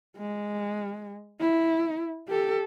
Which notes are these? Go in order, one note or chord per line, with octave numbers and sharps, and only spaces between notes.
G#3
E4
G4 A4